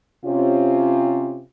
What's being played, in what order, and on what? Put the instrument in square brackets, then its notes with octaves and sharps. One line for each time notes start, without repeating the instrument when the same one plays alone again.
[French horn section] C3 C#4 F4